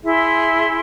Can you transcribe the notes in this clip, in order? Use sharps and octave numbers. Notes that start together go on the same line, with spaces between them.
E4 G#4 E5 C6